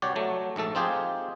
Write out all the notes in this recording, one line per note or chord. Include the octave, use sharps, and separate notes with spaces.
C2 F#4 G4 C#5 D5
F#3 A3
A#1 G#2 A3 A4
C4 D#4 F4 G4 G#4